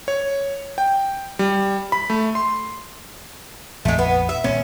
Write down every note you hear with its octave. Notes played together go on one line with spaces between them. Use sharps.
C#5
G5
G3
B5
A3
C6
A#1 F2 A#2 G#3 A3
B3
E5
D#1 C#2 B3 C#4